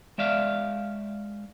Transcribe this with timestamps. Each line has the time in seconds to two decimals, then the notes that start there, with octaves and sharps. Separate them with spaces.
0.18 G#3 D5 E5 F5